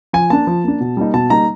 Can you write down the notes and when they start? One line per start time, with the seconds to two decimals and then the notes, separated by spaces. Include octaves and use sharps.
0.13 F3 G#5
0.30 A#3 D4 A5
0.47 F3
0.64 A#3 D4
0.80 B2
0.97 G3 A#3 D#4
1.14 B2 A5
1.30 G3 A#3 D#4 A#5